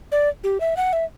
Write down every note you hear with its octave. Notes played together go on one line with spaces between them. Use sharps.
D5
G4
E5
F#5
E5